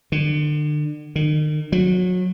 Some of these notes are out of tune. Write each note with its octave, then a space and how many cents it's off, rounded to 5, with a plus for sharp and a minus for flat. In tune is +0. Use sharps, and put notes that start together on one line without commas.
D3 +35
D#3 -35
F#3 -25